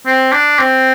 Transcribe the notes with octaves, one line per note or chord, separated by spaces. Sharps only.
C4
D4
C4